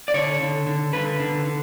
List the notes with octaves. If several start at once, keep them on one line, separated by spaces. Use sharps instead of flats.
D5
D3 C#5
D3
D3
D3 B4
D3
D3